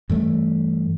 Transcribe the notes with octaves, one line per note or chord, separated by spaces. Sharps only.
G2 E3 A3